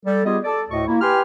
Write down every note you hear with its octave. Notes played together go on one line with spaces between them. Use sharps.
G3 A4
G3 B3 F4 G4 G#4 D#5
A4 D5
D2 A2 D#5 C#6
A#3 E4
G4 B4 G5 G#5 C6 F6